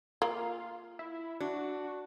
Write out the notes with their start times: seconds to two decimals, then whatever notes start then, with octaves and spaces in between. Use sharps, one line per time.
0.22 A#3 F4
0.99 E4
1.40 D4 F#4